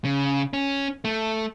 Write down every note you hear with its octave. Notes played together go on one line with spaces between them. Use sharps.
C#3
C#4
A3